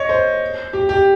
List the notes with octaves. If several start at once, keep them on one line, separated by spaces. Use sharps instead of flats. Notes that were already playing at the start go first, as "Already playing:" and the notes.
Already playing: C#5 D#5
C5
G4
G4